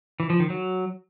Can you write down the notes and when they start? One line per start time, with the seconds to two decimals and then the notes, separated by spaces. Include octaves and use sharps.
0.20 E3
0.30 F3
0.40 D#3
0.50 F#3